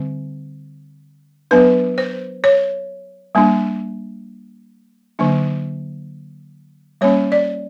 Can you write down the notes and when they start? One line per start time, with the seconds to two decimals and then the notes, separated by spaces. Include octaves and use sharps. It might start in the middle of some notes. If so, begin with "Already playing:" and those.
Already playing: D3 G3 C4
1.51 F#3 B3 D4 B4
1.98 C5
2.44 C#5
3.35 G3 A#3 D4
5.19 D3 F#3 A#3 D4
7.01 G3 A#3 C#4 C#5
7.32 D5